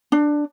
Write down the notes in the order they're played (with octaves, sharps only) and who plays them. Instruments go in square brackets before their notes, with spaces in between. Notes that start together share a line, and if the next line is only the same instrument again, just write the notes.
[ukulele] D4